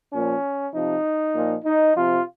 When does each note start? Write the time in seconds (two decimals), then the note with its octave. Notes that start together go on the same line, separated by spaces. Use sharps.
0.13 A#2 F3 C#4
0.73 C3 F3 D#4
1.34 A#2 F3
1.65 D#4
1.95 C3 F3 F4